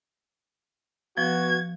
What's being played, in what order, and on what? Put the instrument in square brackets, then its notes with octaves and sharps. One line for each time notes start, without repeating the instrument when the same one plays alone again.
[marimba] F3 [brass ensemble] B3 F#4 [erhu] G#6